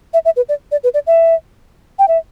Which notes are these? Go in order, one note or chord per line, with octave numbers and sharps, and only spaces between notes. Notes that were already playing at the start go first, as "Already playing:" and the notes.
E5
E5
B4
D5
D5
B4
D5
E5
G5
E5